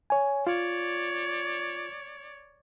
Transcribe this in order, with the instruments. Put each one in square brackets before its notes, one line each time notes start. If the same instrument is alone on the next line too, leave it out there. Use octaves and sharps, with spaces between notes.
[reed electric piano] C#5 G#5
[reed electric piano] F4 [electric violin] C#5 D5